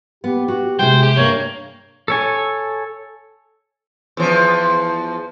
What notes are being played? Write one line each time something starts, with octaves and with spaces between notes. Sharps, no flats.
B3 G4
F#4
C3 G#3 G#4 C5 G5
G4
G2 A#3 C#5
A4 C#5 G#5
E2 F3